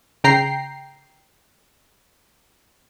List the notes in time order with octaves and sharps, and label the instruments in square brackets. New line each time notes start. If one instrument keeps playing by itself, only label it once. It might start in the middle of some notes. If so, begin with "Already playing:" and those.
[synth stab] C#3 G5 A#5 C7